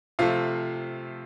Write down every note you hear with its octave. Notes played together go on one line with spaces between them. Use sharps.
C3 F3 A3 F4 F5